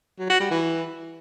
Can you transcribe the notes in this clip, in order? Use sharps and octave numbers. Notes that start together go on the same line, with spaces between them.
F#3
F#4
G3
E3